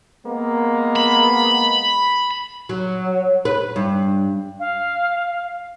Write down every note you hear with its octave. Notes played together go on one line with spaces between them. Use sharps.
G#3 A#3 B3
B5
F#3
B4
G2
F5